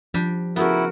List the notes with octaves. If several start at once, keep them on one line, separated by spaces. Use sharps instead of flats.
F3 G3 D4 G4
C#3 A3 B3 E4 F#4 A#4